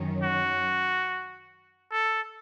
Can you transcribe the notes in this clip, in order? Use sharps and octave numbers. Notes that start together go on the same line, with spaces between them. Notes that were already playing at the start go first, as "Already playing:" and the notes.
Already playing: F#2 D#3 F#3 C#4
F#4
A4